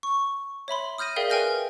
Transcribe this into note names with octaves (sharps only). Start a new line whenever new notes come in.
C#6
C#5 E5 B5 C6
D#6 F6 G6 A#6 D#7
G#4 A#4 D5 E5 F5 G5
B4 G5 G#5 F6 G6 A#6